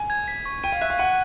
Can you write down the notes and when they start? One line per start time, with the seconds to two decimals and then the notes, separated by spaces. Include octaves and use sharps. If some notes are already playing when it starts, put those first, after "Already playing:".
Already playing: G#5
0.10 G#6
0.28 B6
0.46 C#6
0.64 G5 D#7
0.72 F5
0.81 E5 F#6
0.90 F5
0.99 F#5 D#7